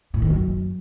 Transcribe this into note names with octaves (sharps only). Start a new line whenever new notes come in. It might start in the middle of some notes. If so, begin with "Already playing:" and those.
A2
D#3
F#2